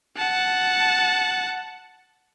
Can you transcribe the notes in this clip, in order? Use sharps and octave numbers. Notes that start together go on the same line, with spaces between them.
F#5 A5